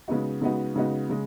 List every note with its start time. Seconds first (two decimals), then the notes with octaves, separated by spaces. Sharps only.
0.08 C#3 G#3 B3 D#4 F#4
0.42 C#3 G#3 B3 D#4 F#4
0.76 C#3 G#3 B3 D#4 F#4
1.10 C#3 G#3